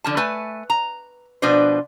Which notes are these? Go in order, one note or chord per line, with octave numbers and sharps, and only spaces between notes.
D3 F3 A5
A3 B4 G#5 A5
A#5
B2 F3 D4 B4 C5